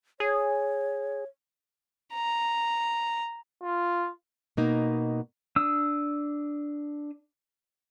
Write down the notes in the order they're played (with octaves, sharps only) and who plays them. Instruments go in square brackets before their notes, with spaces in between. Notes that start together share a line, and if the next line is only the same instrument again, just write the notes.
[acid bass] G#4 [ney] C#5
[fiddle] A#5
[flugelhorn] F4
[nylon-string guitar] B2 A#3 D#4
[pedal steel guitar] D4 D#6 E6